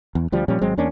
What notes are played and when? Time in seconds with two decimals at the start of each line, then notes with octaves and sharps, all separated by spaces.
0.15 E2
0.32 D2 F3 G3
0.48 A#2 F3 G3 C#4
0.61 G#1 F#3 G#3 C4
0.77 E2 A#3 C#4 D4